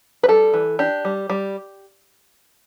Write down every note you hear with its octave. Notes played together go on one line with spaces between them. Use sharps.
B4
G3 A4
E3
D4 G4
G3
G3